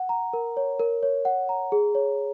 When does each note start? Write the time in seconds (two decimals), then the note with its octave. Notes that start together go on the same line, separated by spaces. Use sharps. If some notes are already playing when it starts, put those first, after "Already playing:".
Already playing: F#5
0.09 A#5
0.33 A#4
0.57 C#5
0.79 A#4
1.03 C#5
1.25 F#5
1.49 A#5
1.72 G#4
1.95 C#5